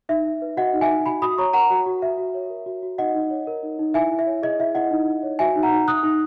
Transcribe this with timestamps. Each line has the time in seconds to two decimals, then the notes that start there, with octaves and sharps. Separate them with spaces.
0.09 D#4 E5
0.25 D#4
0.42 B4
0.57 F#4 D#5 F#5
0.73 D#4
0.81 E5 G#5
0.90 D#4
1.06 F#4 G#5 B5
1.22 F#4 B5 D#6
1.38 C#5 A#5 C#6
1.53 A#4 F#5 A#5
1.70 F#4
1.86 F#4
2.02 F#4 E5
2.18 F#4
2.34 C#5
2.50 A#4
2.66 F#4
2.83 F#4
2.98 D#4 D#5 F#5
3.14 D#4
3.30 C#5
3.47 A#4
3.63 D#4
3.79 D#4
3.94 E4 E5 G#5
4.11 E4
4.19 E5
4.26 C#5
4.43 G#4 D#5
4.59 E4 E5
4.75 E4 D#5 F#5
4.91 D#4
5.08 D#4
5.23 C#5
5.39 F#4 E5 G#5
5.56 D#4
5.63 F#5 A#5
5.72 D#4
5.88 D#4 D#6 F#6
6.03 D#4